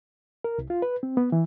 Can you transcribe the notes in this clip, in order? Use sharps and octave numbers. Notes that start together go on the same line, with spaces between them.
A#4
C2
F4
B4
C4
B3
E3